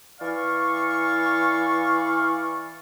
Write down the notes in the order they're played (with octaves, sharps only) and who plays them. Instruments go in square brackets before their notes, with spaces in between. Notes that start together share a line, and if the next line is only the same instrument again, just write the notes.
[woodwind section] E3 D5 F5 C#6